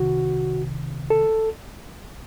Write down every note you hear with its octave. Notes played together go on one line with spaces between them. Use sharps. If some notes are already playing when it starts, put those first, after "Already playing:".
Already playing: C2 C3 D#3 F#4
A4